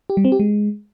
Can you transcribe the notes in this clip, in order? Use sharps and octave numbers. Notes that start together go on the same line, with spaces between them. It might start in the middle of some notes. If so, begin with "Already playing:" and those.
G4
G3
C4
G4
G#3